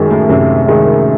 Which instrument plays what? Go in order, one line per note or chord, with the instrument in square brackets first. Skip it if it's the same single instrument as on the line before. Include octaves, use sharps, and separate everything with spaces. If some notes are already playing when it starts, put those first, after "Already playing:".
Already playing: [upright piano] F#2 D#3 G#3
[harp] A2
[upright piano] F#2 [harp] C3
[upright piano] D#3 G#3